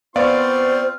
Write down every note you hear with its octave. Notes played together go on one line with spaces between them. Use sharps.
B3 C4 F4 C5 D5 F5 C#6